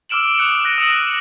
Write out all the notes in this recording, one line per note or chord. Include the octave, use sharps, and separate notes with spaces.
D6 E6 F6 D7 E7 F#7
D6 D#6 F#6 C#7 D7
F#6 A#6 D7 D#7
D#6 E6 A#6 C#7 D#7 F#7